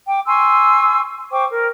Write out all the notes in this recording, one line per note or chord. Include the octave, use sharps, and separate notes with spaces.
G5 D6
G#5 C6 C#6 E6
C5 G5 C#6 D6
A#4